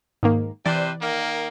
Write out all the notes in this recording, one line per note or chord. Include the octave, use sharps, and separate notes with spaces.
G#2 D#3 A#3
C3 E3 B4 C5 D5
D#3 A#3